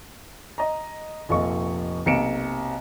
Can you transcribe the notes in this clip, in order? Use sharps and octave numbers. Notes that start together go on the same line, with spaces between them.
D#5 A#5
F1 A#1 F4 A4 D#5 C#6
B1 C3 A#3 C#7 D7 E7